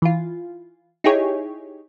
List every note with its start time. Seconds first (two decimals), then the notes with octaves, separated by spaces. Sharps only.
0.02 E3 F4
1.04 D#4 E4 G4 G#4 C#5